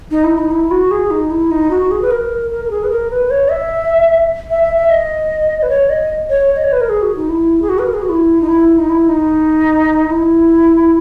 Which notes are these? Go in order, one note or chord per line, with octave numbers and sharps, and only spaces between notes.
D#4
E4
D#4
E4
F#4
G#4
D#4
E4
D#4
F#4
G#4
B4
A#4
A#4
A#4
G#4
B4
A#4
B4
C#5
E5
E5
E5
E5
D#5
B4
C#5
D#5
C#5
D#5
C#5
B4
A#4
G#4
F#4
D#4
E4
G#4
F#4
B4
A#4
G#4
F#4
E4
D#4
E4
D#4
E4
D#4
E4